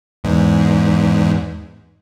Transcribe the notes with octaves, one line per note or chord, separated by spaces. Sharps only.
E2 G#2